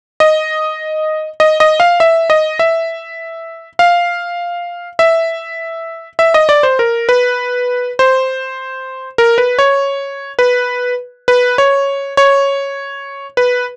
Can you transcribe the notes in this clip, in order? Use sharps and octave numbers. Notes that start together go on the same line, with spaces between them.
D#5
D#5
D#5
F5
E5
D#5
E5
F5
E5
E5
D#5
D5
C5
A#4
B4
C5
A#4
B4
C#5
B4
B4
C#5
C#5
B4